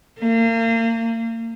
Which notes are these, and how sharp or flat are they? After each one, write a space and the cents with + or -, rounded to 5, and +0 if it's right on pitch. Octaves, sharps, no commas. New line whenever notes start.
A#3 -35